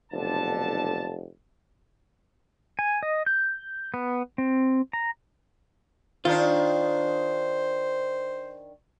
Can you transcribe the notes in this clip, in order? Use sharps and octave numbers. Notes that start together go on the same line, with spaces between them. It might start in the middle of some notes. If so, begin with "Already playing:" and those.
F1 B1 D3 A5
G#5
D#5
G6
B3
C4
A#5
D#3 D4 F4 C5